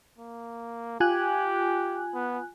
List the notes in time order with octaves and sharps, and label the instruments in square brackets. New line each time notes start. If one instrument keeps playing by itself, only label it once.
[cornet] A#3
[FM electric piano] F4 G#5 F#6 [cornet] G4
[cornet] B3